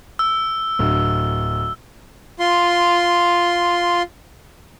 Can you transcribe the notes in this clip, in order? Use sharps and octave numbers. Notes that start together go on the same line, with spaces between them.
E6
D1
F4 C6